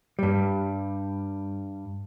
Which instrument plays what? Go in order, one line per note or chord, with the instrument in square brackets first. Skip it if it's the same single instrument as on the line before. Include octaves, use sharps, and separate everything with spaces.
[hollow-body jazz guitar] G2 G3